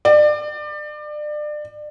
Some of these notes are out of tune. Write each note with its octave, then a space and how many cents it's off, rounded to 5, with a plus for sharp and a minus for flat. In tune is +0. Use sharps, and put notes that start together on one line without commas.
D5 +30